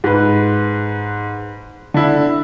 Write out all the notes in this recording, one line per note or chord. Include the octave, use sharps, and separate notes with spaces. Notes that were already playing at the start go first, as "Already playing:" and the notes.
G#2 B4
D3 E4